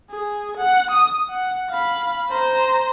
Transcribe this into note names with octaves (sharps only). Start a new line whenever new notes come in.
G#4
F#5
D#6
F#5
F5 B5
C5 A#5